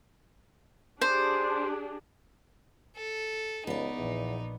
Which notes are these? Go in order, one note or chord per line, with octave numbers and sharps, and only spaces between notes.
D4 G4 G#4 C5
A4
C#2 B3 D#4 D5
A#1 E2